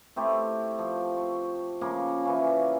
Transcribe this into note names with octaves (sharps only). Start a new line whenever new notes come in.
A3 C4 E4 G4
F3
C#6
C#3 F3 A#3
E3 C#4